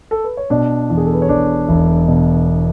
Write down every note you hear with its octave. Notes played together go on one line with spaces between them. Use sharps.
A4
B4
C#5
B2 D4 D5
E2
G#4
A4
B4
C#5
E1 D4 D5
E1
B2